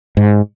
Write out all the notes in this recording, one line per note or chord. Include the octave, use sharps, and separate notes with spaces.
G#2